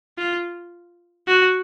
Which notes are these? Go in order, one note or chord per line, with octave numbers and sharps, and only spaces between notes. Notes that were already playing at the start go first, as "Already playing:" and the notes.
F4
F#4